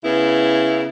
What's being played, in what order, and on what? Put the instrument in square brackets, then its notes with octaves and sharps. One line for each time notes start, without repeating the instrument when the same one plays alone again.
[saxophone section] C#3 B3 E4